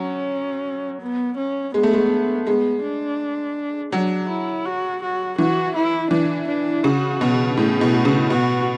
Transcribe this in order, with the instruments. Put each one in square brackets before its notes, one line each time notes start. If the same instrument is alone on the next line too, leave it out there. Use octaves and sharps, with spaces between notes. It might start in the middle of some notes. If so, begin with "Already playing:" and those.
Already playing: [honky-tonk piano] F#3 [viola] C#4
[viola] B3
C#4
[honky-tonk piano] G#3 [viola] B3
[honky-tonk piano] A3
G#3
[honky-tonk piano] G#3 [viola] B3
[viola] D4
[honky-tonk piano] F#3 [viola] D4
[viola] E4
F#4
F#4
[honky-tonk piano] E3 [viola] F#4
[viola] E4
[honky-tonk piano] E3 [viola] D4
[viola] D4
[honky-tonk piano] C#3 [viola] F#4
[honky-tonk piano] B2
[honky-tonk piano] A2 [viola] G#4
[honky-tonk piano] B2
[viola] F#4
[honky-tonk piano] C#3
[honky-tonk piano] B2 [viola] F#4